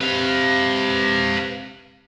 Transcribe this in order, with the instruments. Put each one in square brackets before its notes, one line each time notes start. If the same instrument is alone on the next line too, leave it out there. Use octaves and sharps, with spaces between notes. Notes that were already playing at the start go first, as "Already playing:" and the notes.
[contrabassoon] C3 [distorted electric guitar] B4 F5